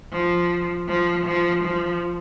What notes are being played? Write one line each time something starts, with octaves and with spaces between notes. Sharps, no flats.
F3
F3
F3
F3